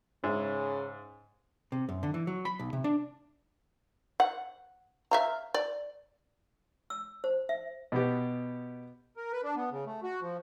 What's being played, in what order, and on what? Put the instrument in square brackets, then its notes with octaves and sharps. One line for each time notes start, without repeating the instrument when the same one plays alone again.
[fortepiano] G#2 E5 [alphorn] C#3
[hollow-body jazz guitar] C3
F#2
D3
E3
F#3
B5
B1
C3
D4
[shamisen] F#5
E5 F5 A#5
D5
[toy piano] E6
C5
E5
[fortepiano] B2 B3 G4
[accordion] A#4
B4
D4
B3
C#3
A3
F#4
F3